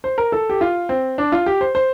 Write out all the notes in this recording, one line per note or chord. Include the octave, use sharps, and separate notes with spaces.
C5
A#4
A4
G4
F4
C4
D4
F4
G4
C5
C5